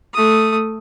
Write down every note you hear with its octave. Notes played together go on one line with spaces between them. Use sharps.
A3 D#6